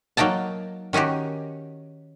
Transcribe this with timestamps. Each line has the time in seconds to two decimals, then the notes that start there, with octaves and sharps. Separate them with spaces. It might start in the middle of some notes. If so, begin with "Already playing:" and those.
0.17 F#3 A#3 D#4 G5 A5
0.93 D#3 C#4 D#4 F#4 G4